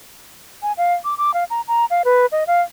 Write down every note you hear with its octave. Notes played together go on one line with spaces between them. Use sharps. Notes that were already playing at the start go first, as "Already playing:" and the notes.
G#5
F5
D6
D6
F5
A#5
A#5
F5
B4
D#5
F5